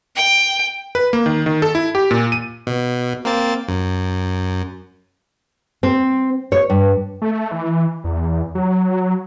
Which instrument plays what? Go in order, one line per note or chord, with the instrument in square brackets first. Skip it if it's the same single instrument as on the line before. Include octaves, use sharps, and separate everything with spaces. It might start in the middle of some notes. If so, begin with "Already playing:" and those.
[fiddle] G5
[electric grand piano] B4
A#3
D#3
D#3
A4
E4
G4
A#2
D#7
[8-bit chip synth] B2
A#3 C4 A6
F#2
[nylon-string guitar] C4
C#5
G2
[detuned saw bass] A3
E3
E2
F#3